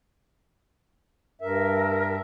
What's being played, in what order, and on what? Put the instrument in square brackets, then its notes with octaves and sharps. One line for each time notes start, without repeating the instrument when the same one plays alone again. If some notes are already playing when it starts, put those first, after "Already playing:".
[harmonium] G2 E5 [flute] A#4